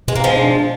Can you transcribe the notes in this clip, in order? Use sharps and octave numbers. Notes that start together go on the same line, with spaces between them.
B2 G#3
A#3
F3 G#3
D4